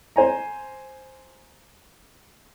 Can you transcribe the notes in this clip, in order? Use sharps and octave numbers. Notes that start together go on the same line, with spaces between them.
C5 G#5 A#5